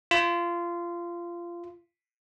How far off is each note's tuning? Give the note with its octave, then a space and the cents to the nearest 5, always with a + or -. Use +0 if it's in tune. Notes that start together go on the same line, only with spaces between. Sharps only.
F4 -20